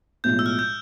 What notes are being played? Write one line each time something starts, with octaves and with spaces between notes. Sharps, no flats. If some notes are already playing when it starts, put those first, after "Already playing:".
B1 A2 F3 G#3 G6
E6
F6
G6